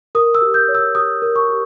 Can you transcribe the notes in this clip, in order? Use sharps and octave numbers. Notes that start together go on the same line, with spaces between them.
A#4 D#6
E6
G4
G6
C#5
E6
G4 D#6
A#4
C#6
G4